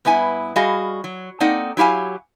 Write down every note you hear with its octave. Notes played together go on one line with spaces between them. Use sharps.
G2 B3 E4 G#5
G3 F#4 G#4 D#5 F5
F#3
A#3 C4 D#4 A4 D5 F#5
F#3 E4 G4 F5 G#5